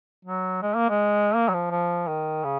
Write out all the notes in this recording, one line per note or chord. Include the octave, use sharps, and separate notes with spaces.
F#3
G#3
A#3
G#3
A#3
F#3
F3
F3
D#3
C#3